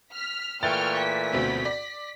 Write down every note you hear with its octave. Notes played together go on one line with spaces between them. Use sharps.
F6 B6
A#2 E3 A3 G5 C#6 F6 A6
B6
D2 B2 C4
D5